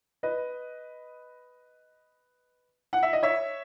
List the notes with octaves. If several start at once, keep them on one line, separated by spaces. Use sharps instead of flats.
B4 D#5
F#5
E5
D#5
C#5 E5